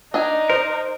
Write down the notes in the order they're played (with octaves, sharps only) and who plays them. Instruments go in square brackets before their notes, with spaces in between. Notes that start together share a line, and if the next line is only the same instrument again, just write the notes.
[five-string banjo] D4 D#5 G#5 [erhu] D#4
[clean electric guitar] A#4 [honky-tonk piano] C5